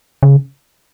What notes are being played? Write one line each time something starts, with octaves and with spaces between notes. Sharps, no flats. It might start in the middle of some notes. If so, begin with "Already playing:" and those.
C#3